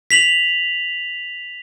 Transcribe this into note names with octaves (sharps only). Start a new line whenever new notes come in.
B6 F7 F#7